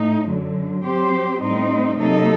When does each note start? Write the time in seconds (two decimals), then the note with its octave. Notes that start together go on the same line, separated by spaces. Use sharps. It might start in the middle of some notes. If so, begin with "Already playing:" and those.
Already playing: A2 A3 D#4
0.27 F#2 D3 F#3
0.84 F#3 C4 G4 C5
1.41 A2 G3 C4 D#4
1.98 C3 F#3 A#3 D#4 A4